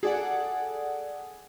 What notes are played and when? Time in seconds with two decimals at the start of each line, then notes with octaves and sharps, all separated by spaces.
0.03 G#4 A4 D5 F#5